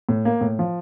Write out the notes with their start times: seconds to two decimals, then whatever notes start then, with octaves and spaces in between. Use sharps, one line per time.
0.09 A2
0.25 A#3
0.41 A2
0.59 F3